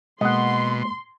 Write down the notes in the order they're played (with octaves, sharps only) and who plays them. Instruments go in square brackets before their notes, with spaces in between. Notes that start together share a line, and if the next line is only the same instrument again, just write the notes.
[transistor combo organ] B2 [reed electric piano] G#3 A#3 [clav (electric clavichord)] D#5 F#5 [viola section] C6